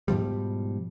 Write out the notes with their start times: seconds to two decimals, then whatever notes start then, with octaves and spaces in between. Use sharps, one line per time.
0.08 G#2 B2 F3 G3